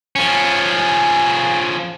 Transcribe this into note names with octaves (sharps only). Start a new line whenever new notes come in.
F3 C#4